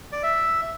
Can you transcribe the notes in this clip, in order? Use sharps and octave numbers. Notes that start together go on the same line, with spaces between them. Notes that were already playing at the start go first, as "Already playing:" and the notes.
D5
E5